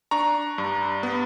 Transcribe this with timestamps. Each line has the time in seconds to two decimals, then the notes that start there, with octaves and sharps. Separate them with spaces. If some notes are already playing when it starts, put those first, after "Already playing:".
0.11 D4 A#5 C#6
0.58 G2
1.03 B3